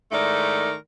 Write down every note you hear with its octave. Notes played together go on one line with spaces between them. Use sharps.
G#2 D#3 A3 E4 A#4 D5